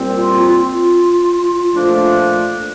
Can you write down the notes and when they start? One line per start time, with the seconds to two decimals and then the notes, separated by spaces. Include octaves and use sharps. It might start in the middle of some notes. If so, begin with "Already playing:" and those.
Already playing: A#2 G3 C4
0.15 F4
0.47 F4
1.72 A#2 F3 A3 D4